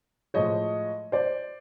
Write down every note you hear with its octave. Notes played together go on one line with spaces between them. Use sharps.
A2 F3 G#3 C#5 D#5
C5 D5